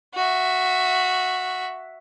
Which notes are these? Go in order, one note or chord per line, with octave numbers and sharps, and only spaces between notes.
F#4 E5